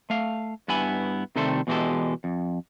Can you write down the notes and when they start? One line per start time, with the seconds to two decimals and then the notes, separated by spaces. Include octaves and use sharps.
0.10 A3 F5
0.68 G2 B3 E4 G#5 B5
1.36 C3 D#3 G3 A3 A4 C5
1.67 E2 B2 E3 G#3 G4 A4
2.24 F2